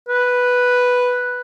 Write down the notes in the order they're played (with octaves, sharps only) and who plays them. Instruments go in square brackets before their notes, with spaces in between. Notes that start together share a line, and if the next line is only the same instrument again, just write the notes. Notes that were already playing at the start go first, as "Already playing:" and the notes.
[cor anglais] B4